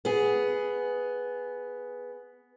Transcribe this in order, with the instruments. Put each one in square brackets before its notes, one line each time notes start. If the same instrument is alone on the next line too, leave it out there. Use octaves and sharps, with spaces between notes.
[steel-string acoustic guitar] B3 G#4